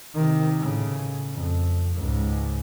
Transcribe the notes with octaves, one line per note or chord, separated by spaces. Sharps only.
C3 D#3
A2 C#3
F2
C#2 G#2